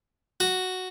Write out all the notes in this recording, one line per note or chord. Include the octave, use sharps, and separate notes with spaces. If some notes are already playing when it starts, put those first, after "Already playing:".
F#4